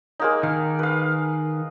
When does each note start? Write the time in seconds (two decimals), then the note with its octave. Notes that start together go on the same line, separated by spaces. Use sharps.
0.20 G#3 A#3 D#4
0.43 D#3 F5
0.79 B4 F5